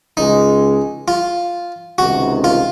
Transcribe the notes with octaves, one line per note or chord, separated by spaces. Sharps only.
C#2 C#3 G#3 D#4
F4
C#2 C3 D#3 F#4
F4